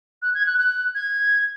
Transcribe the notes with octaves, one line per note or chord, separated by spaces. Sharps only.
F#6
G#6
F#6
F#6
G#6